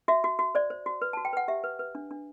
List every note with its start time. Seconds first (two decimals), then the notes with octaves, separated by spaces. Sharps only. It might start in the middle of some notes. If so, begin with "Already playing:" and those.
0.08 F#4 E5
0.24 F#4
0.39 F#4
0.55 C5 D5
0.70 C5
0.86 F#4
1.02 B4
1.13 F#4 A5
1.25 G5
1.33 B4 F#5
1.48 G4 E5
1.64 B4
1.79 B4
1.95 D4
2.11 D4